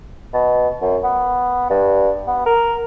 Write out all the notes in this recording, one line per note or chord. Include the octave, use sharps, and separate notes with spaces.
B2
F#2
B3
G2
B3
A#4